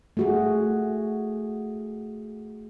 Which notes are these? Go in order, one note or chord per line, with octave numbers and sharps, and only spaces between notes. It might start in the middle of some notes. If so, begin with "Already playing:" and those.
A3 F#4 G#4